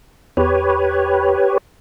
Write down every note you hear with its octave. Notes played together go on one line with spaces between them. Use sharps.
E2 G4 B4 C#5